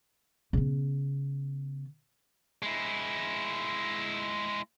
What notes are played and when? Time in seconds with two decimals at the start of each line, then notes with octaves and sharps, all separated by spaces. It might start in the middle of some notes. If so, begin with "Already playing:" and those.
0.53 C#3 B3
2.62 G#3 E4